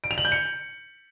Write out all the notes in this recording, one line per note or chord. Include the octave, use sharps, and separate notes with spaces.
D7
F7
F#7
G6
C#7